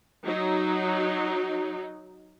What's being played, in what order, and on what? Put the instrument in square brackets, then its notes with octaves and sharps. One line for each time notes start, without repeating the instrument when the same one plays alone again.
[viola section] F#3 D#4